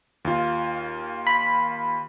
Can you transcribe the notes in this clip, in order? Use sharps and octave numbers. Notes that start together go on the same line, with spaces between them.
D#2 F4
B5